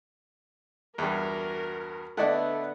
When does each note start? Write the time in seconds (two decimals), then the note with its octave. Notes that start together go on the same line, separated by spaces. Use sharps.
0.98 E2 G2 F#4 A#4
2.17 D3 A3 B3 D4 E4 D5 D#5 F#5